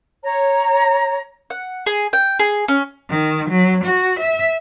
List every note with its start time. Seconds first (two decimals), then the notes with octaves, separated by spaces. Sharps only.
0.24 C#5 A#5
1.50 F#5
1.86 G#4
2.13 G5
2.39 G#4
2.68 C#4
3.10 D#3
3.50 F#3
3.85 F#4
4.20 E5